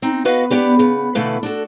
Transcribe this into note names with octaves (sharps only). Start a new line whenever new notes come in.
C4 D#4
B3 F#4 B4 D#5 F5
B3 D4 G4 B4
C#3 B3
B2 D3 E3 A3 B4 F5
D4 F#4 A4